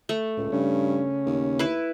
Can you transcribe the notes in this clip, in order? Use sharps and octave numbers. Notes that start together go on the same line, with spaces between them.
A3
C#2 A2
G2 C#3 C#4
D#2
E4 B4